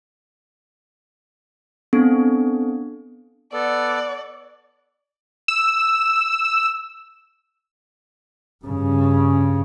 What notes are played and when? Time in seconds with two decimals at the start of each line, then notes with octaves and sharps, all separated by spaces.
1.93 B3 C4 D4 A4
3.53 B3 A4 D5
5.48 E6
8.65 G2 C#3